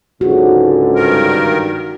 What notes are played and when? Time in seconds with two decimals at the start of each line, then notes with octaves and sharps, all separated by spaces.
0.21 C#2 G#2 D3 F#4
0.96 G2 D#3 A#4